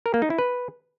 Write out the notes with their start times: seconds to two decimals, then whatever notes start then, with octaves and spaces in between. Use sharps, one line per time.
0.06 A#4
0.14 A#3
0.22 D#4
0.30 E4
0.39 B4